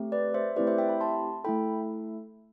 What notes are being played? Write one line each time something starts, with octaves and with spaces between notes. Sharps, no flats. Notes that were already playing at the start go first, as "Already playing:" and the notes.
Already playing: A3 C4 G4
B4 D5
C5 E5
A3 C4 E4 G4 B4 D5
C5 E5
E5 G5
G5 B5
A5 C6
A3 E4 A4 G5 B5